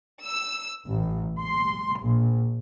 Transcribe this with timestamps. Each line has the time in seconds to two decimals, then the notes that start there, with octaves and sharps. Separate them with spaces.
0.23 E6
0.88 A1
1.41 C6
2.02 A#1